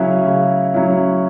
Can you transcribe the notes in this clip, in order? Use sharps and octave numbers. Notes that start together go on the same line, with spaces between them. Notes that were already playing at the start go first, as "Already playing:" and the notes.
Already playing: C#3 F#3 C#4 E4
C#3
F#3 C#4 E4